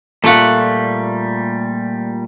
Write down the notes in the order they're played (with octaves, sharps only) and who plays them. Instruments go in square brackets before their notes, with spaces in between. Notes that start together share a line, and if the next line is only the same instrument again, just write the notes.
[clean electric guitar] A#2 G3 [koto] A3 F4 F#5